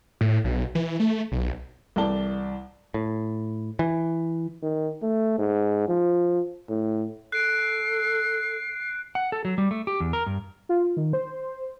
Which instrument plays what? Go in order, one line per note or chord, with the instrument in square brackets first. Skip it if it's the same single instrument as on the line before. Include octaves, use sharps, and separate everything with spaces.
[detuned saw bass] A2
B1
E3
A3
B1
[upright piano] C2 E3 A4 D5 A5 G7
[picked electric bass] A2
E3
[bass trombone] D#3
A3
G#2
F3
A2
[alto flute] A4 [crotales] F#6 D7 [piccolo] C7
[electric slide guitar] F#5
A4
F#3
G3
A3
G4
E2
A#4
G2
[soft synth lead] F4
D#3
C5